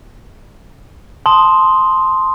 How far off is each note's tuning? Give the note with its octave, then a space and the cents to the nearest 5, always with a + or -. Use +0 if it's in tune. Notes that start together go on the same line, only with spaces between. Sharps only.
A5 +0 C6 +0 D#6 +0